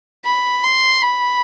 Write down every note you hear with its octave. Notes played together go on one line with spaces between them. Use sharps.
B5
C6
B5